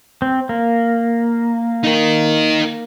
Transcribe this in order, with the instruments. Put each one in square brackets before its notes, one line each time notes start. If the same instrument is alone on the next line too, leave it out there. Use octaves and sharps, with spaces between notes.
[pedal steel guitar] C4
A#3
[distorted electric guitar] D#4 A#4